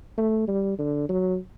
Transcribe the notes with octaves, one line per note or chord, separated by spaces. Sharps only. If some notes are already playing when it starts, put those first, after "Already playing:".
A3
G3
D3
F#3